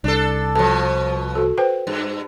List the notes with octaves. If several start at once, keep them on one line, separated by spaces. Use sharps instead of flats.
C2 D4 A4
B2 F3 A4 A5
F#4 A4
B4 C5 G5
G2